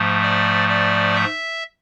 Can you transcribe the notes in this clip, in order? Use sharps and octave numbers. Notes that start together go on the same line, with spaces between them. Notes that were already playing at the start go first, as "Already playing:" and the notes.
Already playing: G#2 F3 A3
D5
D5
E5